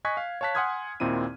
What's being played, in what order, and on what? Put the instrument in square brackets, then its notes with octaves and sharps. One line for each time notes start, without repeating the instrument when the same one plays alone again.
[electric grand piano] D#5 G#5 C#6 F#6 G#6 B6
F5
C#5 F5 A5 F#6 B6
F#5 G#5 C6 D#6 F6 G#6
D#2 A#2 C4 D#4 E4 D#7